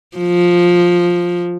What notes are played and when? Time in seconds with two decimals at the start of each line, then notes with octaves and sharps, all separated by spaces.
0.17 F3